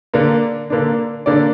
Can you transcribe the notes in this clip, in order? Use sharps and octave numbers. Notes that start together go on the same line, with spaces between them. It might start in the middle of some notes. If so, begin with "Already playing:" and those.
D3 A#3 D4
D3 A#3 D4
D3 A#3 D4 D5